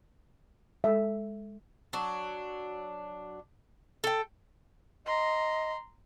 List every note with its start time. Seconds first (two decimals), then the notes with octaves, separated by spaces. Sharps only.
0.84 G#3 A4 E5
1.93 F#3 D4
4.04 A4 G5
5.06 D#5 A#5 C6